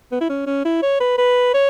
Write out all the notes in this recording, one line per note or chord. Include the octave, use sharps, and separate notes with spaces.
B3
E4
C#4
C#4
E4
C#5
B4
B4
C#5